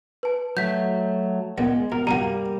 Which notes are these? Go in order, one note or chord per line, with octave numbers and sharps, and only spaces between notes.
B4 A5
F#3 A3 G6 B6
C#2 A#2 G#3 B3
B2 A#4
C2 G2 G3 A#3 F#4 A#5